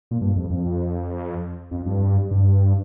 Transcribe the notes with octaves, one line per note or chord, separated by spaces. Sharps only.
A#2
G2
F2
F2
F2
G2
G2